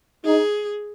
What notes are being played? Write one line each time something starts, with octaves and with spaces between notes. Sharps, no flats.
D#4 G#4